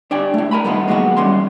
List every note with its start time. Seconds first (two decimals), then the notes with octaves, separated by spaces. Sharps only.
0.11 D4 G4 D5 G5 G#5
0.34 A3 E4
0.51 A#4 G#5 A#5 B5
0.65 G2 D#3 A3 B3 D#4 F4
0.88 F#3 G#3 A#3 B3 E4 F#4
1.17 E3 G3 C#4 C6